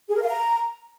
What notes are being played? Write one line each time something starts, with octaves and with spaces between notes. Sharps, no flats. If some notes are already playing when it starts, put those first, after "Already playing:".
G#4
A#4
F5
A#5